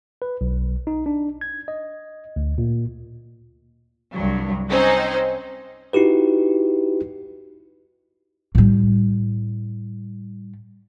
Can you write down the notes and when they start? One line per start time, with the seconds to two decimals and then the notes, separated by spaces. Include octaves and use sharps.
0.22 B4
0.41 B1
0.87 D#4
1.06 D4
1.41 G#6
1.68 D#5
2.36 D2
2.58 A#2
4.13 C2 G2 F#3
4.69 C4 C#4 D#4 C5
5.93 D#4 E4 F#4 G4 B4
8.55 A2 G3